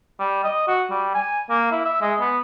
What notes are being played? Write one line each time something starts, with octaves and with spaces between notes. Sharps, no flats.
G3
D#5
F#4
G3
G#5
A#3
E4
E5
G#3
B3